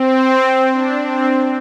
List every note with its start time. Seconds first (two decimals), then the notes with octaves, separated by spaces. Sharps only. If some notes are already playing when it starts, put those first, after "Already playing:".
Already playing: C4
0.72 D4
1.03 C4